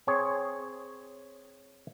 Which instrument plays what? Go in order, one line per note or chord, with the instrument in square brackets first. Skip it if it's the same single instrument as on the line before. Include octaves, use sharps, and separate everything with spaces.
[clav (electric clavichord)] C4 G#4 C#5